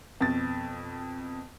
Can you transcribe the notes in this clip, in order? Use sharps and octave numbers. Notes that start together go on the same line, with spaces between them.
F2 B2 A6